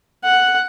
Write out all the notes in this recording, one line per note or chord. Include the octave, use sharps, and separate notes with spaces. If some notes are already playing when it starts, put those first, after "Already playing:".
F#5